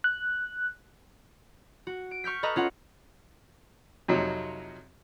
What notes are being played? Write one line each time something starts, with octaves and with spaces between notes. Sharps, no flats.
F#6
F#4
D7
C#6 F6 G6 B6
A4 B4 D#5 A#5
C#4 F4 F#5
F2 C3 F#3 D#4 F4